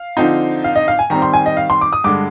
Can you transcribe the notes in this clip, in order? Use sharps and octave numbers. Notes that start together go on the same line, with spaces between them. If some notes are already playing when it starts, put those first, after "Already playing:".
Already playing: F5
D3 F3 C4 D#4
F5
D#5
F5
G#5
D#3 G3 C4 A#5
C6
G#5
D#5
F5
C6
D6
D#6
G2 D3 G#3 D6